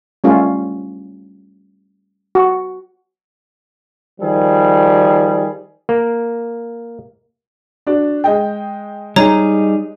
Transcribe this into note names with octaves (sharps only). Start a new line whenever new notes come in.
G3 A3 C#4 F4
F#4
D#3 F3 G3 G#4
A#3
D4 F#4 D5
G#3 D#5 G5
G3 D#4 G#4 C#5 A#5